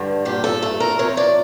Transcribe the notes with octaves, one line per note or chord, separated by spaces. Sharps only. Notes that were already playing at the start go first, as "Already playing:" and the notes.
Already playing: G2 D3
A#2 G4
A4
A3 A4
A#4
F2 C#5
D5